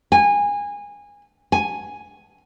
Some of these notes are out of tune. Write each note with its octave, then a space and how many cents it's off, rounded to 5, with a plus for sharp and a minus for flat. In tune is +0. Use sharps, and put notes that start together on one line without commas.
G#5 -20
G#5 +0